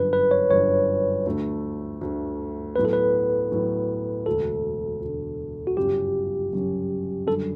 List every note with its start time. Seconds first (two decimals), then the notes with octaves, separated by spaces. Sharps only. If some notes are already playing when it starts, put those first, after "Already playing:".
Already playing: G1 F#2 D3 B4
0.13 B4
0.31 C#5
0.50 G1 F#2 D3 C#5
1.25 D2 D3 A3
2.01 D2 D3 A3
2.76 A2 F#3 B3 B4
2.85 A4
2.93 B4
3.51 A2 F#3 B3
4.26 E1 D2 D3 A4
5.02 E1 D2 D3
5.67 F#4
5.77 G1 F#2 C#3 F#3 C#4 G4
6.52 G1 F#2 C#3 F#3 C#4
7.27 F#2 D3 G3 A4